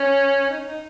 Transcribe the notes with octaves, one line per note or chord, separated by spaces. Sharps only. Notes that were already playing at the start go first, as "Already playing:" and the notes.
Already playing: C#4
D#4
C#4
D#4